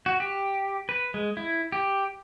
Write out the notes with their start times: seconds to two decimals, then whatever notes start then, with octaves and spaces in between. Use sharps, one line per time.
0.06 F#4
0.20 G4
0.89 B4
1.14 G#3
1.37 E4
1.72 G4